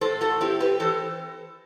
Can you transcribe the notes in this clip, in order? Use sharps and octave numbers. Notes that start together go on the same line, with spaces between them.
A2 A4 C5
F#4 A4
C4 E4 G4
G4 B4
E3 A4 C5